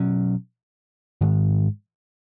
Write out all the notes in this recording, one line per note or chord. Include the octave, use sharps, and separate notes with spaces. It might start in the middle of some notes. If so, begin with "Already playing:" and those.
Already playing: B2 F#3 C#4
G#2 D#3 G#3